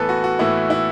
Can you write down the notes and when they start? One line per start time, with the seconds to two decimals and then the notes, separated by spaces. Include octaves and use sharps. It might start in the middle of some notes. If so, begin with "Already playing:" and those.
Already playing: A2 E3 B3 A4 B4
0.09 F#4
0.24 F#4
0.39 A2 E3 B3 E4
0.70 E4